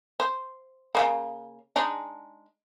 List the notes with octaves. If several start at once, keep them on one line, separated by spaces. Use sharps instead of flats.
C5
C#3 G#3 A#3
G#3 D4 D#4